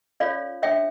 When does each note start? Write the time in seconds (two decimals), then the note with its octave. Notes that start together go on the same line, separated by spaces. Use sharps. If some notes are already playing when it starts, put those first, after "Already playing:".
0.20 C#4 F4 A4 C#5 D5 F5
0.62 D4 A4 C#5 E5 G5